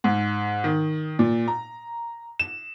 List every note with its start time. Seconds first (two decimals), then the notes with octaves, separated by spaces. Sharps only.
0.04 G#2
0.64 D#3
1.19 A#2
1.48 A#5
2.40 E7